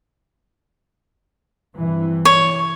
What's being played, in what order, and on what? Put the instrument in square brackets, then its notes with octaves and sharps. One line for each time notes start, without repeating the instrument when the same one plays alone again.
[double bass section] G2 C3 E3
[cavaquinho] C#5